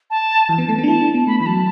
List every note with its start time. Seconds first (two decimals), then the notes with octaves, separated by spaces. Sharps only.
0.10 A5
0.49 E3 A5
0.58 B3
0.68 A3
0.78 B3
0.83 D4
0.87 E4 A5
1.01 D4
1.14 B3
1.27 A3 B5
1.40 E3 B5
1.46 F#3 A5